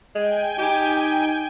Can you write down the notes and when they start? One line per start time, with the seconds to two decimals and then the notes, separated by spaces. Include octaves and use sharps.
0.15 G#3 G5 G#5
0.59 D#4 G4